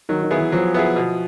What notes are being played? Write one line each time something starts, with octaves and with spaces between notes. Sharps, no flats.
D#3 F#3
D#3
B3 E4 G#4
E3
F3 F#3
B3 E4 G#4
B2